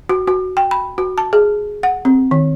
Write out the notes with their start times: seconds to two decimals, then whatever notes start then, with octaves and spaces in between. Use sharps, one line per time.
0.09 F#4
0.27 F#4
0.57 G5
0.71 B5
0.98 F#4
1.18 A5
1.33 G#4
1.83 F#5
2.05 C4
2.31 D#3